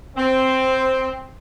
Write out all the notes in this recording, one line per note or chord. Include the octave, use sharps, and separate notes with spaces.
C4